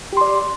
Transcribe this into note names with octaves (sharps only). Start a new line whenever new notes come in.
G4 D5 C6